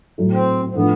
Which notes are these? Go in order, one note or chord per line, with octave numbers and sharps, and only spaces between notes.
A2 F#3 A3
C4
C4
A2 F3 A3 B3 D4